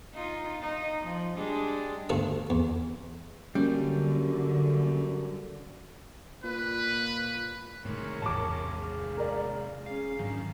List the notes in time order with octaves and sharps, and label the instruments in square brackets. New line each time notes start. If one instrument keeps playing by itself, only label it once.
[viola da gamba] D#4 F4
D#4
F3
G3 G#3 D4
[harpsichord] D2 G2 A3 F5 C#6 D#6
E2
[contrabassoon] F#2 [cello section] D3 [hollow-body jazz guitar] G3 [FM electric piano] A#3 C#4
[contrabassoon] A#2 [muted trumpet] B4
[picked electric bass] A2 D#3 [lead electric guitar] C3 G#3 [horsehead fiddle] A#4 C#5
[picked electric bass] A1 E2 G#2 [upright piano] A5 D6
[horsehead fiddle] G#4 F5
[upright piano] A#4 D5
[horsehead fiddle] C#4 G#4 [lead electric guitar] F5
[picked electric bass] G#2 F#3 D4 [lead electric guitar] D#3 [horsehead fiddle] C#4